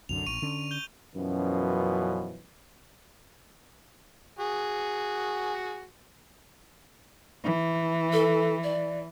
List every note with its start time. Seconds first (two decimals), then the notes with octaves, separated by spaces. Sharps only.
0.09 C2 F#2 D3 F7
0.26 A#1 C#6 D#7
0.42 D3 C#4
0.71 G6 G7
1.16 F#2 B2 E3 F3 C#4
4.39 F#4 G#4
7.43 E3
8.13 A4
8.64 D5